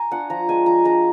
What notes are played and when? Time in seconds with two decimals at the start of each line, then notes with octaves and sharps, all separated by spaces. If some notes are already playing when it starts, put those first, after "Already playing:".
Already playing: G#5 A#5
0.11 D4 F4 F#5
0.30 F3 A#5
0.49 G#3 D4 G#5
0.66 F3 A#5
0.85 G#3 D4 A#5